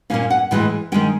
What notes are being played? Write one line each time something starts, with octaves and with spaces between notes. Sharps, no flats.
A#2 F3 A#3 C#4 F5
F#5
A2 E3 G#3 G5
D#3 G#3 C#4 G5